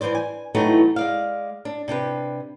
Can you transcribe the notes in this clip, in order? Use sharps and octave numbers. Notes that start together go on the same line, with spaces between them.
G2 D#3 E3 C5 D5
G#5
E3 F#3 A3 B3 D#4 G4
G#3 D5 F5
D4
C3 D4 G4 B4